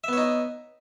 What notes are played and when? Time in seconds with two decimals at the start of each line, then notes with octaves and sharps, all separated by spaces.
0.04 E5
0.08 B3
0.13 C#5
0.17 D#4